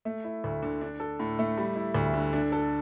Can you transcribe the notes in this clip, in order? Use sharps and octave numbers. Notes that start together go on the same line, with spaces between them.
A3
E4
D2
D3
D4
A4
A2
A3
G3
E4
D2
D3
D4
A4